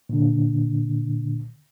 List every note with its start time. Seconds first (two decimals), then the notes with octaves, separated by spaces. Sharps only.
0.09 A#2 D3